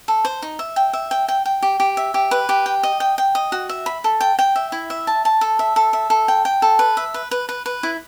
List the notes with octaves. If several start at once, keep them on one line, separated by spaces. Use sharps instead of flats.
A4
C5
D#4
E5
G5
E5
G5
G5
G5
G4
G4
E5
G4
B4
G4
G5
D#5
G5
G5
D#5
F#4
E5
B5
A4
G5
G5
E5
E4
E5
A5
A5
A4
E5
A4
E5
A4
G5
G5
A4
B4
E5
B4
B4
B4
B4
E4